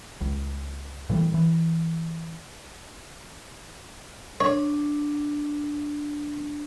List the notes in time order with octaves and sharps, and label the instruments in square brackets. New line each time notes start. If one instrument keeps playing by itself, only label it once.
[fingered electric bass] C#2
A2 E3 G3
E3
[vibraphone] D4 [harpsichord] C#5